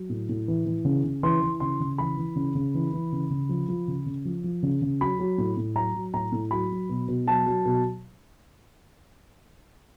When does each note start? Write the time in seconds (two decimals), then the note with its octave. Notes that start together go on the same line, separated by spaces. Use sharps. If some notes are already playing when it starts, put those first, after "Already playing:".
Already playing: F#3
0.09 A2
0.29 A2
0.48 E3
0.66 E3
0.85 C#3
1.04 C#3
1.23 E3 C6
1.42 E3
1.60 C#3 C6
1.80 C#3
1.98 E3 B5
2.17 E3
2.36 C#3
2.55 C#3
2.75 E3
2.93 E3
3.12 C#3
3.30 C#3
3.49 F3
3.68 F3
3.88 C#3
4.06 C#3
4.25 F3
4.44 F3
4.63 C#3
4.82 C#3
5.00 F#3 B5
5.19 F#3
5.38 A2
5.57 A2
5.76 F#3 A#5
5.95 F#3
6.13 A2 A#5
6.32 A2
6.51 F#3 B5
6.71 F#3
6.89 B2
7.08 B2
7.27 F#3 A5
7.46 F#3
7.65 B2